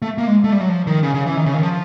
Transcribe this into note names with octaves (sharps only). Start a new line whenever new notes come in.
A3
A#3
G#3
A3
G3
F#3
F3
D#3
C#3
C#3
E3
D#3
C#3
D#3
F3